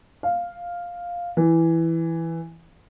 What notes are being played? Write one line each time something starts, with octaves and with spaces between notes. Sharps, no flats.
F5
E3